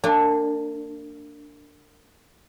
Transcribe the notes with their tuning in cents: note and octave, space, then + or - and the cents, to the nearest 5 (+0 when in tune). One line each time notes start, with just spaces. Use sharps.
A#3 -35 D4 +0 G#5 -45